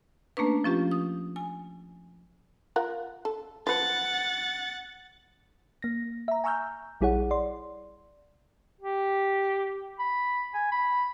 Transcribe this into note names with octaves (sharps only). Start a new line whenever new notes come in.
A3 A#3 C#4 D4 B4
F3 C#4 F4 G4
D#6
G#5
F4 A#4 F#5
A4
F3 B4 F#5 A6
A#3 A#6
E5 A#5
G#5 A#5 C#6 E6 F6 G6
A#1 G3 E4 G#4 C#5 F#5
D5 C6
G4
B5
G#5
B5